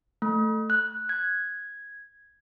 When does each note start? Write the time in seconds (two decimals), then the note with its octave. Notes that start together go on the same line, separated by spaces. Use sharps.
0.22 A3
0.70 F#6
1.09 G#6